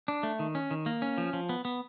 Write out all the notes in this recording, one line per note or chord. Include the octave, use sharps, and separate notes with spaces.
D4
A3
D#3
C#4
D#3
A#3
C#4
F3
F3
B3
B3